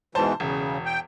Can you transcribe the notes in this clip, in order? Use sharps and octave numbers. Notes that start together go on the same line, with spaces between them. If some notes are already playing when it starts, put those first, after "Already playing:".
G#2 B2 E3 C5 A5
E1 C#3
G5